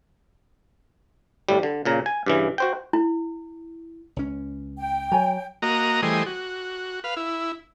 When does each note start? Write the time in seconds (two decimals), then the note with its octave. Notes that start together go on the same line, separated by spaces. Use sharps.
1.49 G1 A2 G3
1.63 D3
1.85 A#2 C#3 A#5
2.06 G#5
2.26 G2 C#3 E3
2.58 F#4 C5 G5
2.93 E4
4.16 C#2 C#4
4.78 G5
5.12 F#3 C#5 G#5 A#5
5.62 A#3 F#4 D#5 A#5
6.02 E3 G3 A3 G#4 C5 D#5
6.26 F#4
7.04 B4 F5
7.17 E4